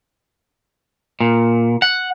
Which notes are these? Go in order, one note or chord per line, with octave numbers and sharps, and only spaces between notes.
A#2
F#5